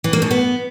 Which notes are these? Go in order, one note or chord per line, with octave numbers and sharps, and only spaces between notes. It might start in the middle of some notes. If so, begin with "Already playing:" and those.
E3
A#3
B2
B3